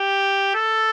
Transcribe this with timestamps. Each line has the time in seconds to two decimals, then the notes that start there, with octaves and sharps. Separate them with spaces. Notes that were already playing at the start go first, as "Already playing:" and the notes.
Already playing: G4
0.55 A4